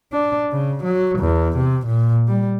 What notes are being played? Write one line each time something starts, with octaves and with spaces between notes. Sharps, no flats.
D4
C#3
F#3
E2
C3
A#2
G3